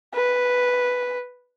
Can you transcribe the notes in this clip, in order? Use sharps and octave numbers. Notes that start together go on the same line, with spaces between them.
B4